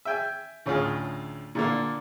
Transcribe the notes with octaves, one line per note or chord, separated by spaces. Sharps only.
E5 G5 G#5
D2 A2 C#3 F4 G#4
A#2 D3 A#3